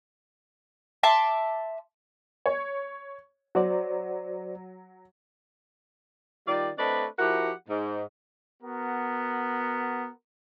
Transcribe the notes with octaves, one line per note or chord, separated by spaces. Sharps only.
E5 A5 C6 D6
C#5
F#3 F#4 C5 D5
D#3 G3 F4 D5
A3 C4 D4 B4 D5 D#5
F3 E4 F#4 G4 A#4 F#5
G#2
B3 F#4 A#4